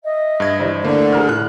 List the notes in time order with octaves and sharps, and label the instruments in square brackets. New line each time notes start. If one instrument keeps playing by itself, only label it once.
[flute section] D#5 E5
[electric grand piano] G2 G#6
[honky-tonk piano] E3 G3 C5
[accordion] D3 [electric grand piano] A3 A#3 [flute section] D5
[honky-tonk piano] G#4 A#4 F6
[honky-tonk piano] A2 [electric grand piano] F#6